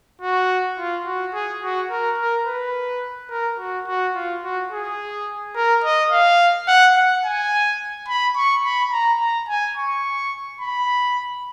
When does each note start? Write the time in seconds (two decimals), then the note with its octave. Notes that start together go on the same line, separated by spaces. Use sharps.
0.21 F#4
0.78 F4
1.06 F#4
1.34 G#4
1.63 F#4
1.90 A#4
2.18 A#4
2.46 B4
3.30 A#4
3.59 F#4
3.87 F#4
4.15 F4
4.43 F#4
4.71 G#4
5.55 A#4
5.84 D#5
6.12 F5
6.68 F#5
6.96 F#5
7.25 G#5
8.08 B5
8.36 C#6
8.65 B5
8.92 A#5
9.21 A#5
9.49 G#5
9.77 C#6
10.61 B5